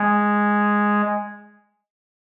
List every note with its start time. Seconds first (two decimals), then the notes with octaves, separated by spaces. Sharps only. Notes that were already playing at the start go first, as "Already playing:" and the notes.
Already playing: G#3